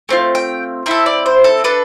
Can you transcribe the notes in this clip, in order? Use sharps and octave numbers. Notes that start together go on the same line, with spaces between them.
A3 C4 F4
G5
C4 E4 A4 E5
D5
C5
A4
D4 A4 B4